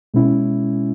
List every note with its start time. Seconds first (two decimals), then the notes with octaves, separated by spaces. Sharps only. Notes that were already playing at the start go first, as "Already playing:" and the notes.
0.14 B2 G#3 C#4 E4